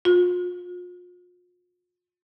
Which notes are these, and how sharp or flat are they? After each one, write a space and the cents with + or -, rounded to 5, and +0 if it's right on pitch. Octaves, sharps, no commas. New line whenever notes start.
F4 +40